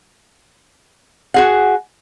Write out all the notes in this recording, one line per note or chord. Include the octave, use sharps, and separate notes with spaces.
F#4 G#4 F#5